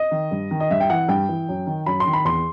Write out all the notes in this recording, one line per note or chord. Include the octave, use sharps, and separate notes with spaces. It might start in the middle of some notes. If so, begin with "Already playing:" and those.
Already playing: D#5
D#3
G2
D#3
D#5
G2 E5
G5
E3 F#5
G2 G5
E3
F#2
D#3
F#2 B5
C6
D#3
B5
E2 C6